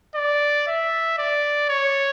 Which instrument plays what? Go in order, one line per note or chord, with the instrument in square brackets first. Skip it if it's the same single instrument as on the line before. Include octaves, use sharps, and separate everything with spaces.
[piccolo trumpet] D5
E5
D5
C#5